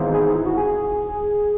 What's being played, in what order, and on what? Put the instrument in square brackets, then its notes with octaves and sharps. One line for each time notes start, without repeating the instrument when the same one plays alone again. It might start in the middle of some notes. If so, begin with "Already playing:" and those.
Already playing: [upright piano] G#1 G#2 E3 B3 D#4
[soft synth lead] G#4
G#4
E4
F#4
G#4